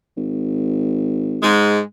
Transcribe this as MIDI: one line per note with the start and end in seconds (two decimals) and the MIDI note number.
0.17 1.64 32
1.43 1.82 44
1.43 1.82 56